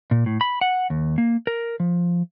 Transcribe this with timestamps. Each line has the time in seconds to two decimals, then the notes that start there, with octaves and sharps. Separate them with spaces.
0.11 A#2
0.26 A2
0.41 B5
0.61 F#5
0.90 D#2
1.18 A#3
1.47 A#4
1.80 F3